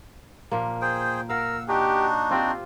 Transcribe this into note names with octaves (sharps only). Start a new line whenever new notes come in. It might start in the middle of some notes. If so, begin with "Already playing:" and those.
A#2 F3 A#3
G#4 C5 G5
A#4 F5 F#5 E6
D4 D#4 F#4 G4
C4 F4 G4 C5